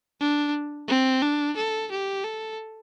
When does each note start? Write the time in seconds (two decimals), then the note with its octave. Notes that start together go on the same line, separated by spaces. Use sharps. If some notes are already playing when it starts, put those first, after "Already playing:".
0.21 D4
0.88 C4
1.22 D4
1.57 A4
1.91 G4
2.24 A4